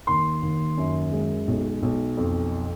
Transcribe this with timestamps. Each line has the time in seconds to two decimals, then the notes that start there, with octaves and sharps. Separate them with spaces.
0.07 D#2 C6
0.42 D#2
0.77 F#2
1.12 G#3
1.48 B1
1.82 B1
2.17 F2